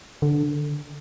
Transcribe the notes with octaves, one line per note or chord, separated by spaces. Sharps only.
D3